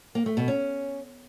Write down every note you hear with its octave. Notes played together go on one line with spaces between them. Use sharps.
A#3
A3
B2
C#4